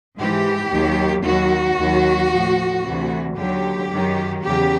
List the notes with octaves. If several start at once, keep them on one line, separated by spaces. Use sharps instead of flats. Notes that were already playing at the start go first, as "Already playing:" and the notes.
G#2 E3 G4
D#2 D#3 F#3
D#2 D#3 F#3 F#4
D#2 D#3 F#3
A2 F3
D2 C3 E3
D#2 D3 F#3 G4
F#2 D#3 F#3
E2 C#3 F#3 G4